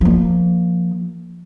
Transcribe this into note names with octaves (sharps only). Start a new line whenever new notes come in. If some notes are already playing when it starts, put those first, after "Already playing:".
F3 A#3